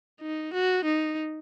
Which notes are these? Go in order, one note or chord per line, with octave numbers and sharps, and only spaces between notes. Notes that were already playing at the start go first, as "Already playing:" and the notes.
D#4
F#4
D#4